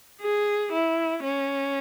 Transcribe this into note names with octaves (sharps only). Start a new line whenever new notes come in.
G#4
E4
C#4